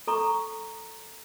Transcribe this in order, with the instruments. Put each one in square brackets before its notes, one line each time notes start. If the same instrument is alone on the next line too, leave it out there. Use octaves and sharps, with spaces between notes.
[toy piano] A4 A#5 C#6